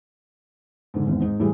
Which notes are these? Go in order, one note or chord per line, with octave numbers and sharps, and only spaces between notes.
G#2 D3
G#1 E2
G#2 D#4
A2 E3 G3 G#3